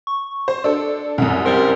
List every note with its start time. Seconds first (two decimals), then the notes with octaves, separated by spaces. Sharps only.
0.07 C#6
0.48 C5
0.64 D4 A4 E6
1.18 C2 F#2 C#4
1.45 G3 C4 A#4 C6